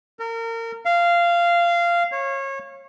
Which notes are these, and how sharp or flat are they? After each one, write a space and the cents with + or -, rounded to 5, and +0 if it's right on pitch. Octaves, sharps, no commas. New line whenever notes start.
A#4 -30
F5 -15
C#5 -25